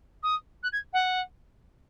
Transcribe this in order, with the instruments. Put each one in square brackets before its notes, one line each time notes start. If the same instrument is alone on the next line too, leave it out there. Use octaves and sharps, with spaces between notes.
[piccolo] D#6
F#6
G#6
F#5